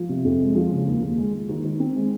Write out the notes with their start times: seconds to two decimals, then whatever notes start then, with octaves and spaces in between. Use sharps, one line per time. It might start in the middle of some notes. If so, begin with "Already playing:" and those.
Already playing: F3
0.09 C3
0.25 F2
0.40 G#3
0.55 F3
0.71 C#3
0.86 D#2
1.02 D#2
1.17 G#3
1.33 G#3
1.49 D#3
1.64 D#3
1.80 C4
1.95 G#3